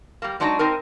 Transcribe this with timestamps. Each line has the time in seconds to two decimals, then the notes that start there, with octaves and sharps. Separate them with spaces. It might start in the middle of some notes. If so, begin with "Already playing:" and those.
0.22 G3 A#3
0.40 F#3 G#3 D4 D#4 F#4
0.59 C4 D#4 A#4